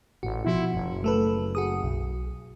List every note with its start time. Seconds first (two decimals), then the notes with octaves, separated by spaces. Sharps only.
0.23 A1 F#4
0.45 B2 F3 E4 F#4
0.73 F#1
1.04 A3 A4 B4
1.55 F#4 G#4 D#6
1.83 B1